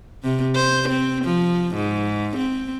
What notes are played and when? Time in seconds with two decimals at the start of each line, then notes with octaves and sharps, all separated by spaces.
0.24 C3
0.55 C5
0.89 C4
1.25 F3
1.75 G#2
2.37 C4